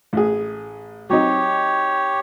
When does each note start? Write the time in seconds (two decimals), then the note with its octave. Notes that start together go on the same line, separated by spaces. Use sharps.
0.13 A1 G#4
1.10 F#3 C4 D#4 G4 C#5